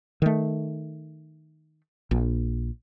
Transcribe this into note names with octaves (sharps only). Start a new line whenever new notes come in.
D#3 A3
A#1